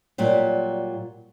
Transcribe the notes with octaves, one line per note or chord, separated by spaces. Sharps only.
A#2 F#3 G3